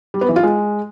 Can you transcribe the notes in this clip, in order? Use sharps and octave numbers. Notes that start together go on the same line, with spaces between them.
G3
B3
E3
F4
G#3